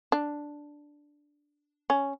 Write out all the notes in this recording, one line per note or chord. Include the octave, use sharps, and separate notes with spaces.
D4
C#4